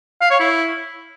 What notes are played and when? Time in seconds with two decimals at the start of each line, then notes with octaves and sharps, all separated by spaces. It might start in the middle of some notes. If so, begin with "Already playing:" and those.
0.21 F5
0.31 C#5
0.40 E4